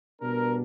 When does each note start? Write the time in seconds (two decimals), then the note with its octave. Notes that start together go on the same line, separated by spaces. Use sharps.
0.21 B2 G3 B3 D4 A#4